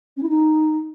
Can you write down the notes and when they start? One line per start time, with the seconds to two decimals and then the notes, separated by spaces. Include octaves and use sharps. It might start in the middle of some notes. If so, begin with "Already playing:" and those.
0.16 C#4
0.22 E4
0.28 D#4